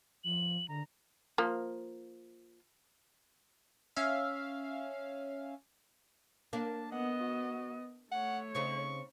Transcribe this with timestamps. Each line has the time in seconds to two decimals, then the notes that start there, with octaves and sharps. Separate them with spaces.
0.24 F3 F#7
0.68 D3 A#5
1.38 F3 A#3
3.96 C#4 E5 F5
6.53 A#3 D4 A5
6.92 B3 D#5 F#5
7.21 F#4
8.12 A3 C#5 F#5
8.55 C#3 C4 D#4 C#6